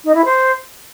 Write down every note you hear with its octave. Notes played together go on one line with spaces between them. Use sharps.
D#4
E4
C5